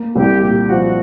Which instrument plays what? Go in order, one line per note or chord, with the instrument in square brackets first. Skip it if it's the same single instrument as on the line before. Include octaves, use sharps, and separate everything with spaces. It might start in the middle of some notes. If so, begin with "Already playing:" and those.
Already playing: [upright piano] A#3
[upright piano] C2 [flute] G4
[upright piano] A#2 [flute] G4
[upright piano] F3 [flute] F#4